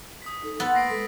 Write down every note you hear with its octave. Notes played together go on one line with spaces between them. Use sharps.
D#6 B6
D#4 A4
B3 F#5 C6 E6 A6
A#3 A#6 C7 D7
G#3 A4 B6